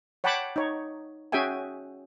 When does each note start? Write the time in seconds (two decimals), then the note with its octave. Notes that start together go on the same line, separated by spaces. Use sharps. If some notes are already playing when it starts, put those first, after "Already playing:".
0.24 C#5 F#5 G5 A5 B5 D6
0.56 D#4 C#5
1.32 C#4 F#4 G#4 E5 G5 G#5